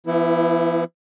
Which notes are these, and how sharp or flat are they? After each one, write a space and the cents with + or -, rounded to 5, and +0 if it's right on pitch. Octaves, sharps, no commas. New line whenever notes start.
E3 +45 B3 +0 E4 +0